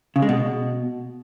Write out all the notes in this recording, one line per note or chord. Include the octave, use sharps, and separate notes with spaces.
C#3
G#3
B2